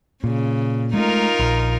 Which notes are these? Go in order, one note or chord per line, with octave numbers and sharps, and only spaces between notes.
A#2 C#3
G#3 A3 D#4 F4 A#4
A#1